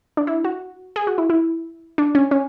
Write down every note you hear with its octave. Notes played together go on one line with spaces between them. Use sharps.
D4
E4
F#4
G#4
F#4
E4
E4
D4
C#4
C#4